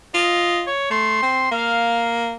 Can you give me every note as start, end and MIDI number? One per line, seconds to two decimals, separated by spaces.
0.14 0.69 65
0.14 0.60 75
0.67 0.91 73
0.91 1.19 57
0.91 1.50 84
1.23 1.50 60
1.52 2.36 58
1.52 2.07 77